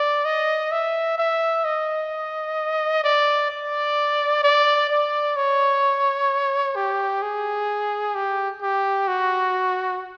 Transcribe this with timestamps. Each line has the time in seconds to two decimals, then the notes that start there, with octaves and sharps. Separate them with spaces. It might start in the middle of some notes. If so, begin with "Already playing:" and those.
Already playing: D5
0.25 D#5
0.72 E5
1.18 E5
1.65 D#5
3.04 D5
3.50 D5
4.44 D5
4.90 D5
5.36 C#5
6.76 G4
7.22 G#4
8.15 G4
8.62 G4
9.08 F#4